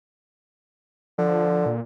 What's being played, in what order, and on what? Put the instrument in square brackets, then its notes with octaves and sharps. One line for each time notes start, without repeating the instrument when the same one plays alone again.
[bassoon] D3 [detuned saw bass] F3
[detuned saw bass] A#2